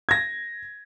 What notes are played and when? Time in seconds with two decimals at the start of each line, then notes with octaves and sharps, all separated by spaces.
0.09 G#6 A#6